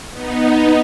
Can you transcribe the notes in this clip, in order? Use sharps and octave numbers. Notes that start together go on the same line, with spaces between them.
B3 D#4